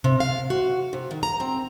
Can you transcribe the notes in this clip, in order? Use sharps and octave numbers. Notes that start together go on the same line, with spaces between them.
C3
F5
F#4
C3
D#3
A#5
C4